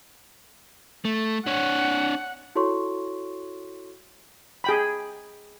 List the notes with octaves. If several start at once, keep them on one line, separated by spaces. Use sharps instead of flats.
A3
D4 C#5 F#5
E4 F#4 A4 C#5 C6 C#6
G#4 G5 B5